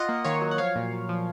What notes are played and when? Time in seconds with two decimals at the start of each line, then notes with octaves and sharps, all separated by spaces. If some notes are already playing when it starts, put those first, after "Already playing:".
Already playing: F4 D#5 F#5
0.09 A#3
0.25 D#3 C#5 F5
0.41 F#3
0.51 F#5
0.58 F3 C#5 F5
0.76 A#2
0.93 A#2
1.09 F3